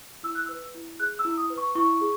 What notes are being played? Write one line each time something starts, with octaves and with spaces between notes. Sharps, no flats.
E4 E6
F#6
B4 E6
E4
G#4 F#6
E6
E4
D#6
B4
C#6
E4 C#6
G#4